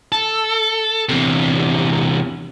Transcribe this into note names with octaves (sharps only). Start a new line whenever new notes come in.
A4
E2 C3